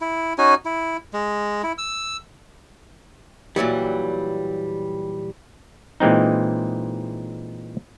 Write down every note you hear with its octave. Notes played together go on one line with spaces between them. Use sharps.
E4
C#4 D#4 F#4 G#5
E4
G#3
E4
E6
A#2 E3 F#3 G3
A#2 E3 G#3 C4 D#4